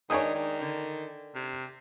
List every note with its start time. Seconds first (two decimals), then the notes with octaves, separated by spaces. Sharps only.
0.10 D#3 G#3 D4 C#5 G#5 D#6
0.35 D#3
0.62 D3
1.35 C3